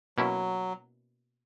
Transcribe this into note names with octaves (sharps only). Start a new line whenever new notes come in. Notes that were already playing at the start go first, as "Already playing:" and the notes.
B2 F#3 A#3 C#4 E4